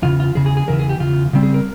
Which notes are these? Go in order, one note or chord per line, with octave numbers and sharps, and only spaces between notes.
E2 C#3 F4
F4
E2 C#3 G#4
G#4
G#4
E2 C#3 E3 A#4
G#4
G4
E2 C#3 F4
C#3 G3 C4
G#4
A#4